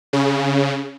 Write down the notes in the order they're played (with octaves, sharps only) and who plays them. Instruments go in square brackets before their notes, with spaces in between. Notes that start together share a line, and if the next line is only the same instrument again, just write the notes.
[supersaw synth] C#3